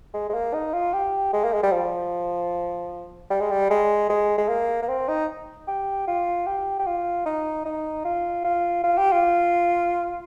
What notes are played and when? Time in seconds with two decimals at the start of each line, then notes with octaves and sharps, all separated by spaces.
0.14 G#3
0.29 G#3
0.34 A#3
0.54 D#4
0.74 F4
0.93 G4
1.33 G#3
1.44 A#3
1.53 G#3
1.63 G3
1.72 F3
3.30 G3
3.41 G#3
3.51 G3
3.70 G#3
4.09 G#3
4.38 G#3
4.49 A#3
4.82 A#3
4.89 C4
5.08 D#4
5.68 G4
6.07 F4
6.46 G4
6.79 G4
6.86 F4
7.26 D#4
7.65 D#4
8.05 F4
8.45 F4
8.84 F4
8.98 G4
9.12 F4